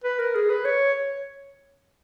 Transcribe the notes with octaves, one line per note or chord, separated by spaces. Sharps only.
B4
A#4
G#4
B4
C#5